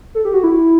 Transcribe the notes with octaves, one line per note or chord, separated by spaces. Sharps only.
A4
G4
F#4
E4